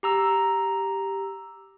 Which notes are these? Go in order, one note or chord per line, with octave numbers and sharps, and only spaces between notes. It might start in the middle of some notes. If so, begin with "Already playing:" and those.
G4 A#5 E6